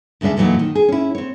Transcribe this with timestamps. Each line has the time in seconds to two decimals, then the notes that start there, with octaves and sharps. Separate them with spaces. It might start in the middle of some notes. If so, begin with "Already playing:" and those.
0.21 D2 C#3 G#3 D4 E5
0.37 F2 A#2 E3 F#3 A#3 D#4
0.59 D#3
0.75 G#4
0.88 C#4 E4
1.15 C4 C#5